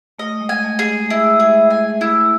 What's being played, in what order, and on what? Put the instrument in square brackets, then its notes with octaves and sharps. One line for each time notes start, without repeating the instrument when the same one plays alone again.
[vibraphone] A3 [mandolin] D#5
[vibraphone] G#3
[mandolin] G#5
[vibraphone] A3
[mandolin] G#4
[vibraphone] G#3
[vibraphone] A3 [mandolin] E4
[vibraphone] G#3 [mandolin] G#4
[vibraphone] G#3 [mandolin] G#5
[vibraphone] A3 [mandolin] E4